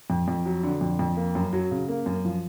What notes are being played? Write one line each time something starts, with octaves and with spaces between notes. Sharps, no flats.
F2
F2
F#3
D3
F2
F2
A#3
F#2
F#3
C#3
A#3
F#2
F3